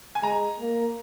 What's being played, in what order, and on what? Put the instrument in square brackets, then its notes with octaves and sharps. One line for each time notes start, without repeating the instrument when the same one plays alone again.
[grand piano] G#5
[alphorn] G#3 [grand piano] A#5
[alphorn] A#3